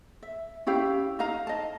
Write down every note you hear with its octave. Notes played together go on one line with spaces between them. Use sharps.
E5
C#4 E4 G4 F5
D#4 F5 A#5
D#5 A5